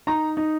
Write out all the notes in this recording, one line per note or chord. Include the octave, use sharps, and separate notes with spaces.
D#4 A#5
D#4